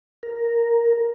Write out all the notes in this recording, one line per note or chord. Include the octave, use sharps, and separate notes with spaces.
A#4